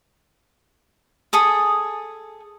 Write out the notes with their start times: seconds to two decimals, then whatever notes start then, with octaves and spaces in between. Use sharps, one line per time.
1.33 G#4 A4 D#6